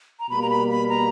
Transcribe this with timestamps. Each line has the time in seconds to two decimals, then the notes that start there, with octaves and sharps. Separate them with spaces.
0.20 A#5
0.30 B2 G3 A#3 B5
0.42 A#5
0.50 B5
0.70 B5
0.89 A#5